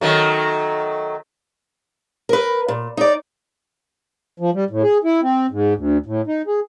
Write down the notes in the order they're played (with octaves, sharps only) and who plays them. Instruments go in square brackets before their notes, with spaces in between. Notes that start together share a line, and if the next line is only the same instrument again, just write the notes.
[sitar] D#3 F#3 A3
[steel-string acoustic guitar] A#4 B4
A#2
D#4 D5
[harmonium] F3
G3
A2
G#4
E4
C4
G#2
D2
A2
D#4
G#4